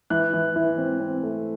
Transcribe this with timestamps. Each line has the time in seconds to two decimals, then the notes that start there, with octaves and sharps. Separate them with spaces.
0.10 E3 F#6
0.33 E3
0.56 E3
0.78 C4
1.00 C4
1.23 A3